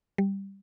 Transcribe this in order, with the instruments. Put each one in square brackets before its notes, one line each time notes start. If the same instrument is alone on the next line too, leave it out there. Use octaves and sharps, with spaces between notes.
[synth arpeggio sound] G3